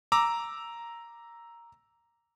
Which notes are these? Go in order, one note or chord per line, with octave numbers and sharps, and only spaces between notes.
A#5 D6 E6